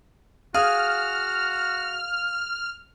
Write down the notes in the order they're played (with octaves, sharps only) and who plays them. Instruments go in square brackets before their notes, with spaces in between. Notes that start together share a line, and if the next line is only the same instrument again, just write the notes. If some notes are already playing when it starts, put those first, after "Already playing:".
[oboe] F#4 [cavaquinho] G#4 [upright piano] F5 [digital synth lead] F6